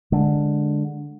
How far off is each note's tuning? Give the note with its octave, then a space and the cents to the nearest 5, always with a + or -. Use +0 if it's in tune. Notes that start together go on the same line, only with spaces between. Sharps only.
D3 +0 G#3 +5